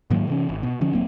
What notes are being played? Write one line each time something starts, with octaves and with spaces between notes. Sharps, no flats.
G#2 D#3 F#3 A#3
C3 E3 C#4
G#1
B2
D3 F3 C#4
D#1 F#3 A#3 C4